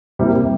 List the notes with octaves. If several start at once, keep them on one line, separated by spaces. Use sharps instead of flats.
C3 G3 A#3 E4